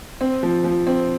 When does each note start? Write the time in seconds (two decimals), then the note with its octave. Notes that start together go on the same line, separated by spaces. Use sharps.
0.21 C4
0.43 F3
0.64 F3
0.87 C4